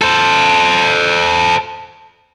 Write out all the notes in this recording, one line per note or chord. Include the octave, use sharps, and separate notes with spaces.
A4 C5